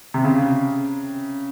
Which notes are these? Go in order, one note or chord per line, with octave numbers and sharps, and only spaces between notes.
C3
C#3